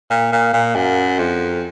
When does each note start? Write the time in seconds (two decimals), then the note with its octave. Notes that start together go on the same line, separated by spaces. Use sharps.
0.10 A#2
0.32 A#2
0.53 A#2
0.75 F#2
1.19 F2